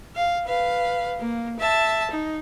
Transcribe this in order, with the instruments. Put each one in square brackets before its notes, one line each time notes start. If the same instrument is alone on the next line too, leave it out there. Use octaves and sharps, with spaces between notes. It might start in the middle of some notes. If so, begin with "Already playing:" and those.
[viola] F5
B4 F5
A#3
E5 A5
D#4